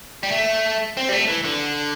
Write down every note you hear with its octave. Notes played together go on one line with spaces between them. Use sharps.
G3
A3
C4
G3
A3
E3
D3